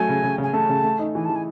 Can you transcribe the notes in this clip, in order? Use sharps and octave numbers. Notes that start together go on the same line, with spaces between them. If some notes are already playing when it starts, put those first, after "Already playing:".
Already playing: F#3 A3 G#5
C#3
C#3
C#3
G#5
A3 A5
C#3
A3
D#4
E3 G#5
A5
E3
G#5